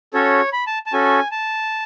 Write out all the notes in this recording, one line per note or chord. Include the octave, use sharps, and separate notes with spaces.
C#4 F#4 A4 C#5
B5
A5
A5
C#4 F#4 A4 G#5
A5